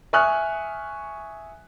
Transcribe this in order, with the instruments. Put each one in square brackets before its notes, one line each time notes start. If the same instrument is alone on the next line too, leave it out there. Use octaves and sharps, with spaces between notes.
[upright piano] E5 G#5 C#6 D#6 F6 F#6